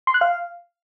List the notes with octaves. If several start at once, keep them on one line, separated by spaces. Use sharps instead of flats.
C6
F#6
F5